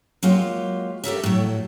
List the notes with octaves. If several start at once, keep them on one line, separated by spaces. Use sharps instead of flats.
F#3 G#3 A#3 F4 G4
G4 A4 A#4 E5
A2 F#3